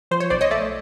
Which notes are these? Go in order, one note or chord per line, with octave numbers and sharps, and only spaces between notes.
F3 C5
C#5
B1 C5 D5
C#5 D#5
A3 D5 E5